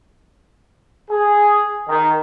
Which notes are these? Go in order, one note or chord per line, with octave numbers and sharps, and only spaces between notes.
G#4
D#3